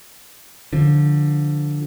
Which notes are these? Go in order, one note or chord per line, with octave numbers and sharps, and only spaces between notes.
D3 F3